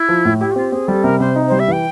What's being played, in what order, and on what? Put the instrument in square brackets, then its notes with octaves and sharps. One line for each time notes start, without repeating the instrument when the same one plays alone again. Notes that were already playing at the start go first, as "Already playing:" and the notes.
Already playing: [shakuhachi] E4
[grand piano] F3
A2
[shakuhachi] E4 [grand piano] G4
[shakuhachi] F#4
[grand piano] C4 [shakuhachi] F4
[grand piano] C4 [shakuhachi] G#4
[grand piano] G3 [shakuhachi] A4
[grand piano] C3 [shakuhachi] A#4
[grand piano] C3 [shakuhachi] C5
[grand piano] D#4
[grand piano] G3 [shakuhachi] C5
[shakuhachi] E5
[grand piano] E3 [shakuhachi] G5